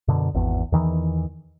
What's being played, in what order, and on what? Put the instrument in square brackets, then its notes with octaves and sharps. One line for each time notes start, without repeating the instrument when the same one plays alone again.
[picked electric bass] F#2 B2 D3
G#1 E2
E2 D#3 E3